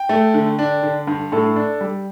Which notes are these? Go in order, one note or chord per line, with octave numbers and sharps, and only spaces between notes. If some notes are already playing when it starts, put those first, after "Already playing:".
Already playing: G5
A3
D3
D4
D3
G2
A2 A4
D4
G3